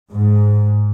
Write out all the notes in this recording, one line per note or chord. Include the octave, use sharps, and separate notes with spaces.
G#2